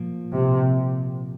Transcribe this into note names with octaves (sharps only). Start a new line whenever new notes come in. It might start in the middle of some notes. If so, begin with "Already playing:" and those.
Already playing: A#2 F3 A#3
C3